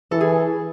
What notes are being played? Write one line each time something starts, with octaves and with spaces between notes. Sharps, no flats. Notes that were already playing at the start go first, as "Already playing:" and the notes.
E3 A4
G#4